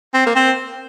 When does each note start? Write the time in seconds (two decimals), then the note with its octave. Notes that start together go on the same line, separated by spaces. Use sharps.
0.14 C4
0.27 A#3
0.36 C4